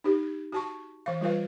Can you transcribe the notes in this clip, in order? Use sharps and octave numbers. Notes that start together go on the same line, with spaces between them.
D#4 G4
F#4 A5 C#6
E3 F5
G3 F4 B4 F5